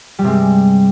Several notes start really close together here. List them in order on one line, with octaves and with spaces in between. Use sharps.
G3 G2 C3 G#3